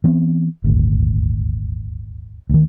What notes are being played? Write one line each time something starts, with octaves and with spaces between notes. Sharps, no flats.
E3 B3 C4
D#1 G#1 D2
D2 D#3